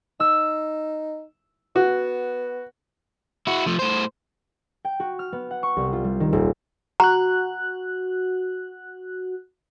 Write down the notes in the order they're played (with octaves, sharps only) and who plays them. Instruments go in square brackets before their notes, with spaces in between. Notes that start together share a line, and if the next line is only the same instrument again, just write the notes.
[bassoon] D#4 [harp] E6
[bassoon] B3 [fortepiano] F#4
[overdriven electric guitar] E4 F#4
F3 A3
A2 C5
[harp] G5
F#4
F6
B3
F#5
C#6
C2
F4
G3
D#3
D#1
[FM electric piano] F#4 F#6 [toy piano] A#5